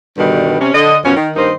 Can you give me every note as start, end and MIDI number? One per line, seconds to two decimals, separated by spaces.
0.18 0.58 43
0.18 0.58 47
0.18 0.58 50
0.18 0.58 51
0.18 0.58 55
0.60 0.71 48
0.60 0.71 61
0.74 0.97 50
0.74 0.97 75
1.04 1.13 42
1.04 1.13 47
1.04 1.13 53
1.04 1.13 61
1.17 1.31 51
1.36 1.51 43
1.36 1.51 51
1.36 1.51 58
1.36 1.51 63
1.36 1.51 72
1.36 1.51 75